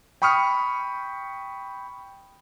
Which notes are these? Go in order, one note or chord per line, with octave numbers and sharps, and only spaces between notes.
G5 B5 C#6 D#6 F6 C#7